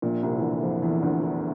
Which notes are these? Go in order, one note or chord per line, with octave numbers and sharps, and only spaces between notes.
A#1 A#2
C2 C3
E3
D2 D3
F2 F3
E2 E3
D2 D3
E2 E3